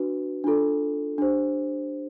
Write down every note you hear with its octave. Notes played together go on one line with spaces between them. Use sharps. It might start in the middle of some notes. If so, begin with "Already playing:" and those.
Already playing: D4 F#4 B4
D4 F4 A4
D4 G4 C5